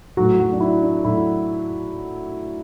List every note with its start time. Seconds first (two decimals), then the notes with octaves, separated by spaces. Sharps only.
0.17 A2 F#3 A3 F#4
0.39 F#3 F#4
0.52 D4
0.60 E4
0.83 D4
1.05 A2 F#3 A3 E4